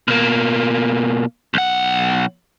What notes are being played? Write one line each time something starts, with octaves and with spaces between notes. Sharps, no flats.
B2 A#3
B1 F#5